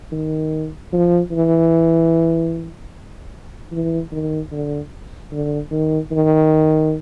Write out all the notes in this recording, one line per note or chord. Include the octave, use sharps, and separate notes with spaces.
D#3
F3
E3
E3
D#3
D3
D3
D#3
D#3